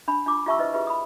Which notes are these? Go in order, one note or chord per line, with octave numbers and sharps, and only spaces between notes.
D4 B5
D4 F4 D6
F4 G4 E5 A5 C#6 E6
E4 B4 C5 D#5 E5
F4 G4 G#4 B4 E5
B5 D#6